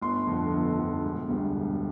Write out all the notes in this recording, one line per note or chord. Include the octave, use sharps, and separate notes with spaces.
G1 C6
F2 D3
G1
F2 D3
E1
D2 D3 G3
E1